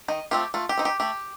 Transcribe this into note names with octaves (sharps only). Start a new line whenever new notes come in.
D#3 D#5
A3 C4 F4 G4
A3 F4
G4
C4 D#4
G4
A3 G4